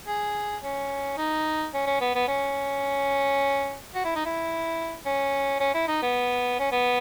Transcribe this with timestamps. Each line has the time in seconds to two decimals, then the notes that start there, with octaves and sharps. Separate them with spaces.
0.07 G#4
0.63 C#4
1.17 D#4
1.74 C#4
1.86 C#4
2.00 B3
2.15 B3
2.28 C#4
3.95 F#4
4.04 E4
4.15 D#4
4.25 E4
5.05 C#4
5.60 C#4
5.74 E4
5.88 D#4
6.02 B3
6.59 C#4
6.72 B3